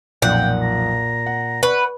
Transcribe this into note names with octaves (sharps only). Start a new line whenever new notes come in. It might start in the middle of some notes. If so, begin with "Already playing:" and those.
B1 F2 A#2 F#5 G5
A#5
F#5
B4 F#5 C#6